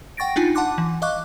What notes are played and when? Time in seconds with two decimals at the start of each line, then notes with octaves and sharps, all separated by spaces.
0.17 F#5 G5 C#6 A6 A#6 D7
0.36 D4 D#4 F4 G#5
0.55 F#5 A5 C6 D6 F#6
0.78 E3
1.02 D#5 F5 C#6 D6 F#6